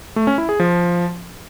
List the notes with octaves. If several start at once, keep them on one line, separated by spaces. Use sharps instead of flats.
A3
C#4
E4
G#4
F3